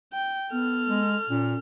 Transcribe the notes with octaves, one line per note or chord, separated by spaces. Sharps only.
G5
B3 A4 F6
G#3
A#2 C#4